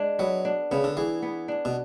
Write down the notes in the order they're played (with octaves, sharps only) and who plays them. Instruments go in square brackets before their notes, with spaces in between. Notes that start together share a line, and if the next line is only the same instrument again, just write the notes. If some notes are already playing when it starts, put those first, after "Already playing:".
Already playing: [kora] G#3 D4
[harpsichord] F#3 [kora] B3
[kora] D4
[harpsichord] C#3 [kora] B3
[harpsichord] D3
[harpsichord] E3 [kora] G#4
[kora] B3
D4
[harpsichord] B2